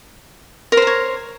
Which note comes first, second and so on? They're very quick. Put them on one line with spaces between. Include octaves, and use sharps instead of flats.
A#4 C5 A#5 C#5